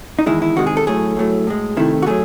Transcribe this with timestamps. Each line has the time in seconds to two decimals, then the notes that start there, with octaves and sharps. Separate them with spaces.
0.19 D#4
0.26 E2 D#3 G#3 E4
0.42 E4
0.56 C3 D#3 G#3 F#4
0.67 G#4
0.77 A4
0.87 A2 F#3 A3 G#4
1.17 A2 F#3 A3
1.47 A2 G#3
1.77 C3 D#3 A3 E4
2.02 F#4
2.06 F#3 A3 G#4